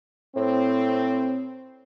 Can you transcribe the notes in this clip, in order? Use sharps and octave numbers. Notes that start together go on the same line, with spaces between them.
A2 C4